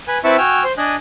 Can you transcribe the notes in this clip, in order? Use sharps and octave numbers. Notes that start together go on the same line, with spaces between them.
B4 G#5
C4 E4 B4 E5 A5 C#6
F#4 G5 G#5 E6 F6
C5
D4 D#5 G#5 F#6